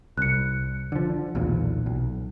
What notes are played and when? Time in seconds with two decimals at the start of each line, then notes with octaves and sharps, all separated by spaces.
0.18 C2 F#6 C#7
0.92 D3 F3
1.35 B1 E2 A#2
1.86 B1